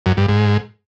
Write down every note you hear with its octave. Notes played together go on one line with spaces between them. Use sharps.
F#2
G2
G#2